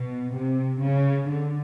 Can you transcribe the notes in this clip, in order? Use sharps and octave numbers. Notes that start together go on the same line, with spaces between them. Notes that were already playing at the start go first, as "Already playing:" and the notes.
Already playing: B2
C3
C#3
D3